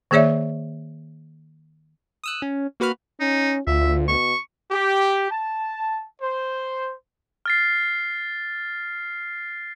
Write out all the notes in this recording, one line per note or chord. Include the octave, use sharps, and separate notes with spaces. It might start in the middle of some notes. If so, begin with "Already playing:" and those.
D#3 A#3 G#4 C#5 D5 E5
D#6 E6 F#6
C#4
A#3 F#4 B4 B5 F6
C#4 D#4
D2 F4 E5
B2 C#6
G4
A5
C5
F6 A6 C7